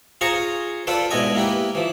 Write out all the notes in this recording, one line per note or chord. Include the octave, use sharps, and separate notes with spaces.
F4 G#4 C5 A#5 C#6
F4 A4 B4 C5 D5
G#2 B2 E4 D5 D#5 G#5
A#3 E4 G4 B4
E3 F3